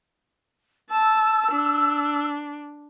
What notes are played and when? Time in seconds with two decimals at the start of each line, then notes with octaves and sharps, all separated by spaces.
0.90 A5 E6
1.52 D4